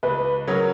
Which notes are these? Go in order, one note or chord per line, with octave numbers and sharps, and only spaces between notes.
C#2 B4
C#3 F#3 C#4 A#4